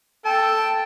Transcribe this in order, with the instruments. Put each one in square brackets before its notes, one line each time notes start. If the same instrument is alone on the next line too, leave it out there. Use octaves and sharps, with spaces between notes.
[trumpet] A4 [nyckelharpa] G5 [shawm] A5